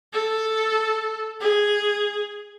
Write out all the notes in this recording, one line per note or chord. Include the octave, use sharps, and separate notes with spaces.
A4
G#4